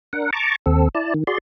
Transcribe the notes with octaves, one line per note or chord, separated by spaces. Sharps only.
D4 A#4 F#5
A5 A#5 C#6 D6
D#2 C4 A4
E4 D5 A5
D#3
F#4 G#4 D5 C6